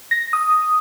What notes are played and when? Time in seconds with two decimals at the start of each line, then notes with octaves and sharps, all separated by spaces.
0.11 A#6
0.33 D#6